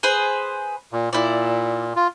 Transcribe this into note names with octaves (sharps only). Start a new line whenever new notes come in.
G#4 B4 C5
A#2
A#2 E4 D5
F4